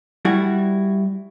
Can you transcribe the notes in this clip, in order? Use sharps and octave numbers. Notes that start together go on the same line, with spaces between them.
G3 E4 F#4